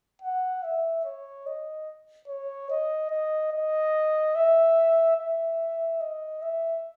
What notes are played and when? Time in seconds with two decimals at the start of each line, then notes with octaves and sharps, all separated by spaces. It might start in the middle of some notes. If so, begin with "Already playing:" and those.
0.22 F#5
0.63 E5
1.05 C#5
1.47 D#5
2.28 C#5
2.70 D#5
3.10 D#5
3.53 D#5
4.35 E5
5.17 E5
6.01 D#5
6.42 E5